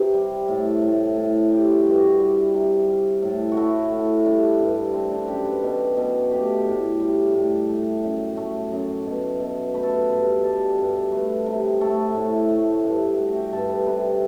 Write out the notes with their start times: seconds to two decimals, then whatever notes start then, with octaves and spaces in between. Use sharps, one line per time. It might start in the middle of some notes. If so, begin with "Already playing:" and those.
Already playing: C3 B4
0.14 G3
0.48 A2
0.82 A2
1.16 A2
1.51 G3 G4
1.67 F#4
1.80 G4
1.85 G2
1.90 F#4
2.02 E4
2.20 G3
2.54 C3
2.88 G3
3.22 A2
3.52 F#4
3.57 A3 E4
3.91 A2
4.26 G3 D4
4.59 G2
4.94 A3 C4
5.12 D4
5.28 F#2 G4
5.45 B4
5.63 B2
5.97 B2
6.31 A3 G4
6.66 A2
7.00 G3
7.34 A2
7.69 A3
8.03 F#2
8.37 A3
8.72 F#2
9.06 B2
9.40 B2
9.74 A3 B4
9.83 A4
9.92 B4
10.09 G2 B4
10.43 G3 A4
10.78 G2
11.11 A3 B4
11.46 C3
11.81 A3 A4
12.15 A2
12.49 A3
12.84 G2
13.17 A3 F#4
13.35 G4
13.52 G2 A4
13.70 B4
13.86 C3 B4